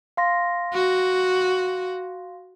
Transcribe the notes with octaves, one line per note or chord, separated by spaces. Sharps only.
F5 C6 A#6
F#4